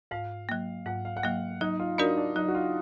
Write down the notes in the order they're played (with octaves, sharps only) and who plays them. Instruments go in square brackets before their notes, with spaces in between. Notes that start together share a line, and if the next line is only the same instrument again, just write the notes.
[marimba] G#2 [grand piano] F5
[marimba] F#3 A#3
[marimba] G#2 [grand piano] F#5
[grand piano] F5
F#5
[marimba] F#3 A#3 [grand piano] F5
[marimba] F#3 [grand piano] D#4
[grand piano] F4
[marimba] D4 F#4 A#4 D5 [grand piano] D#4
[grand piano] D4
[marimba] F#3 [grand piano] D#4
[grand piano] F#4
F4